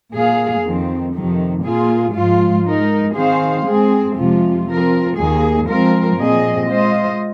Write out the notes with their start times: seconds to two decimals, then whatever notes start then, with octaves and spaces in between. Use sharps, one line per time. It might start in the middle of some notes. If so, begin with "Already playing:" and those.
0.12 A#2 A#3 G#4 F5
0.63 F2 D#3 C4
1.13 F2 C3 D#3
1.64 A#2 A#3 F4 G#4
2.14 G#2 F3 G#3 F4
2.64 G#3 D#4 A#4
3.15 D#3 C4 G#4 C5 F5
3.66 G#3 C4 G#4
4.15 F2 C3 F3 G#3 F4
4.66 F3 C4 F4 A#4
5.17 D#2 D#3 A#3 G#4
5.67 F3 G#3 C4 F4 A#4
6.17 A#2 F3 C4 G#4 D#5
6.67 G#3 F4 C5 D#5